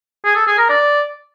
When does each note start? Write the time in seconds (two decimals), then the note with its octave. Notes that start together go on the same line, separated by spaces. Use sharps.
0.25 G#4
0.36 A4
0.47 G#4
0.58 A#4
0.69 D5